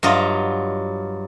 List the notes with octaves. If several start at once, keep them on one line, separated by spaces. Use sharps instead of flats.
G2 F#3 F4 D#5